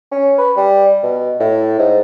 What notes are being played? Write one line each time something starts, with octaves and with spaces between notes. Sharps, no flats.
C#4
B4
G3
B2
A2
G#2